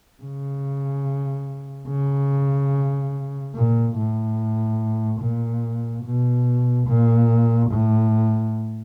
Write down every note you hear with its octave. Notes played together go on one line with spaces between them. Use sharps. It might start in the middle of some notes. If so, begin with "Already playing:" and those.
C#3
C#3
A#2
A2
A#2
B2
A#2
A2